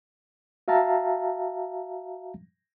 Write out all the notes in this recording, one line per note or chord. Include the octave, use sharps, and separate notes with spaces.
F#4 E5 F5 A5 A#5